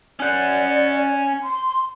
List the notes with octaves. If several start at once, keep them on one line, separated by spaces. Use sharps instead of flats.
C#4 D5 F#5
C6